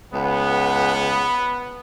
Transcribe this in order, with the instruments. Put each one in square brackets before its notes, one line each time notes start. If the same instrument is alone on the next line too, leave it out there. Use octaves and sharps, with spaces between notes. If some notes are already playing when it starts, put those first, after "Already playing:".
[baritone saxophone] C#2 [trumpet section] B3